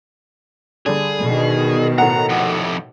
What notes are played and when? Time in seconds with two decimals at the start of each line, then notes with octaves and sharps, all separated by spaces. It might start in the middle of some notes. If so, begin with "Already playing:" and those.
0.86 D3 G3 G#4
1.21 B2 D#3
1.98 A2 F#5 A#5
2.29 F2 C3